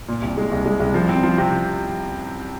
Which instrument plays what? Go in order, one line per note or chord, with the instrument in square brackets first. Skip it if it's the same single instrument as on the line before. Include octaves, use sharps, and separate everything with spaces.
[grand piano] A#2
C2
G#3
C2
G#3
C2
F3
C4
F3
C3